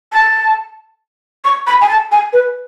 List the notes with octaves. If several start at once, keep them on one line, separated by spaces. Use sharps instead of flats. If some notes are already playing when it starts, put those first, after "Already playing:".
A5
C#6
B5
G#5
A5
G#5
B4